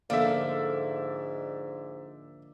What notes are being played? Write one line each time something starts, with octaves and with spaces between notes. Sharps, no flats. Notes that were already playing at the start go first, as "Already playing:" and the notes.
G#2 D3 F3 A#3 A4 D5 E5